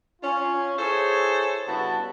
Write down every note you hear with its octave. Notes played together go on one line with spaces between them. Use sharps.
C#4 F4
E4 G#4 A4 C5 C#5
G2 C#3 B3 E4 F#4 A5